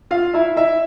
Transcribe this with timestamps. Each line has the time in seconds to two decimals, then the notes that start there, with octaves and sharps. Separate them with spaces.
0.11 F4 F5
0.33 E4 E5
0.57 E4 E5